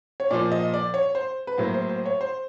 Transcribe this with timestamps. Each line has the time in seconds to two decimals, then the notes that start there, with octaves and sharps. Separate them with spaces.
0.20 C#5
0.30 A#2 F3 A#3 D5
0.52 D#5
0.74 D5
0.94 C#5
1.15 C5
1.47 B4
1.58 A2 F#3 A#3 C5
1.74 C5
1.89 C5
2.06 C#5
2.21 C5